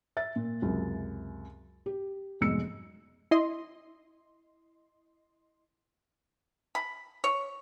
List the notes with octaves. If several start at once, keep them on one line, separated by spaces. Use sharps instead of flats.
E5 A6
A#2
C#2 F#2 C3
G4
F1 B1 G#2 G#3 E6 C#7
E4 D#5 C6
B5
C#5